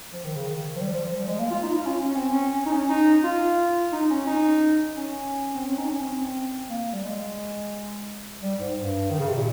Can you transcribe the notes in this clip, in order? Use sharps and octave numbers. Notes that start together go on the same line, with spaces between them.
F3
D#3
C#3
D#3
F3
G3
F3
F3
G3
G#3
A#3
F4
D#4
F4
C#4
C#4
C4
C#4
C#4
D#4
C#4
D#4
F4
D#4
C#4
D#4
C#4
C4
C#4
D#4
C#4
C4
A#3
G3
G#3
G3
G#2
G2
D#3
C#3
C3
A#2